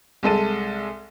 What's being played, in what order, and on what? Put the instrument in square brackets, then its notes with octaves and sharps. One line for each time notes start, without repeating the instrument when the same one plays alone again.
[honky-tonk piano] C2 G#3 A4 D#7